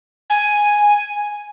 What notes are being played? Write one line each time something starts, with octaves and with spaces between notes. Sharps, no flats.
G#5